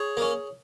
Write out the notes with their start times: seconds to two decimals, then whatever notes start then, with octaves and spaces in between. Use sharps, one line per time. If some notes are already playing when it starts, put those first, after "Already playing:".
Already playing: G#4 C#5
0.17 A#3 C#4